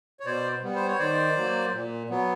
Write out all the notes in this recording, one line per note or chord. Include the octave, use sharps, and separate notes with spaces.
C#5
B2 C5 D5
G3 B3
C5
C#5
D#3 C5 D5
F#3 A#3
A#2
F#3 B3